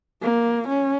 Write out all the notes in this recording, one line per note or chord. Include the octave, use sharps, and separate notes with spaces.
A#3
C#4